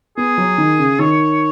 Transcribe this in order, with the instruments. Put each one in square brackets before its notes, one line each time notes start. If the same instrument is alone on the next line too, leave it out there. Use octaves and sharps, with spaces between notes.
[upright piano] B3 [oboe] G#4
[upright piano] F#3
D#3
C#3
[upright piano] D#3 [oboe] C#5